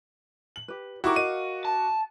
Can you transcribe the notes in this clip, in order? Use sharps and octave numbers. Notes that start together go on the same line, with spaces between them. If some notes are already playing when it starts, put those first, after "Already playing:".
F#7
G4 B4
D#4 E4 F#4 G4 A#4 C#6 D6
A#4 D#5 F5 D#7
A5